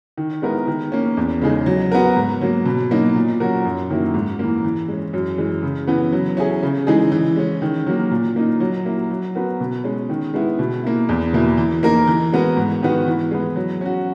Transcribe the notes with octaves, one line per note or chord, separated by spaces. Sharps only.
D#3
G#3 B3 E4 A#4
D#3
A#3 C#4
E2
C#3 G#3 D#4 G#4
F#3
B3 F#4 A#4
G#2
F#3 A#3
B2
F#3 A#3 D#4
A#2
F#3 C#4 F#4 A#4
F#2
D#3 F#3 A#3 E4
G#2
E3 A#3
E3
G#3 C#4
F#2
E3 G#3
C#3
E3 B3
F#3
C#4 E4 G#4
C#3
E3 G#3 D#4 G#4
E3
G#3 C#4
D#3
F#3 A#3
A#2
A#3 D#4
F#3
A#3 E4
F#3
B3 F#4 A#4
B2
G#3 C#4
D#3
G#3 B3 E4
B2
A#3 E4
E2
B2 A#3 E4
E3
A#3 D#4 A#4
E3
G#3 B3 F#4 A#4
G#2
D#3 G#3 B3 F#4
E3
G#3 B3
F#3
C#4 F#4